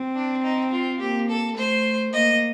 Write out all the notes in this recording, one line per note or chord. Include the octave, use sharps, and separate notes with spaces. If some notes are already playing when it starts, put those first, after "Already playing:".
Already playing: C4
D4
D#4
F4
A#3 G4
A4
A3 C5
A#3 D#5